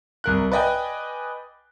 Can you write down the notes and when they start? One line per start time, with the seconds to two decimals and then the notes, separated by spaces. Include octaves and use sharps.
0.24 C2 A#4 F#6
0.52 B4 D5 D#5 G5 G#5